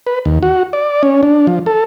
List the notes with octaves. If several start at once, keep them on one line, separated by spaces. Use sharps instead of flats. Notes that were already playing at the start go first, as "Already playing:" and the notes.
B4
D#2
F#4
D5
C#4
D4
F3
A4